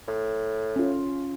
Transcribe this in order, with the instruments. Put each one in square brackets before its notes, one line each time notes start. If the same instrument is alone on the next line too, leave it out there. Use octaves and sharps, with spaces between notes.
[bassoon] A2
[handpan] C#4 F4